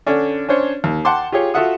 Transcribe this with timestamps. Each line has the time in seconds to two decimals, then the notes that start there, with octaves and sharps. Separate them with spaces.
0.07 D3 C#4 D4
0.49 C#4 D4 C5 C#5
0.84 D#2
1.05 F#5 G5 A5 C6 D6
1.32 F4 G4 G#4 C#5
1.54 F4 F#4 A4 E5 F#5 D#6